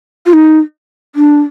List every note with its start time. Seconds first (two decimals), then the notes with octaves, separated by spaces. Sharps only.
0.26 F4
0.33 D#4
1.15 D4